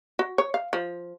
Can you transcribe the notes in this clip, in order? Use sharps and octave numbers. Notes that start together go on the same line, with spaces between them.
F#4
C#5
F5
F3